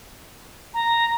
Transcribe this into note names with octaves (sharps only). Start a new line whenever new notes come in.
A#5